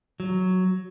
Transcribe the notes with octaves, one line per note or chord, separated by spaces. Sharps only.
F#3